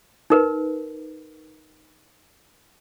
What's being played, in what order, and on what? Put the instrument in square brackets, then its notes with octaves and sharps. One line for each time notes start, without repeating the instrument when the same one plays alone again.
[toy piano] D#4 A#4 B4